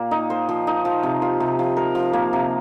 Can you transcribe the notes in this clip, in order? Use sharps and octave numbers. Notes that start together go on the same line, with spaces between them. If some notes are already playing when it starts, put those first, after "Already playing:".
Already playing: A#2 A#3 G4
D#4
C5
F3
D#4
F3
C3
F4
C3
F3
A#4
F3
A#3
C3